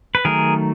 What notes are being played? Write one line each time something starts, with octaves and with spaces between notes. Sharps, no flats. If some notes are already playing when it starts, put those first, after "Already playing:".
B4
D#3 F#3 A3 G#4 A#4